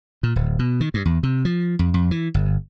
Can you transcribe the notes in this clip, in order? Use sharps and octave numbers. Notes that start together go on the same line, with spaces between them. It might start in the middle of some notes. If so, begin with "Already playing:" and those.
A#2
D1
B2
D#3
G2
E2
C3
F3
F2
F2
E3
G1